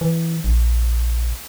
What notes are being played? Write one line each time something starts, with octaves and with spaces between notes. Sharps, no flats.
E3
A#1